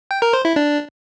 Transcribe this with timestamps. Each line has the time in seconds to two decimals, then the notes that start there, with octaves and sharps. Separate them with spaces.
0.11 G5
0.22 A#4
0.33 C5
0.45 E4
0.56 D4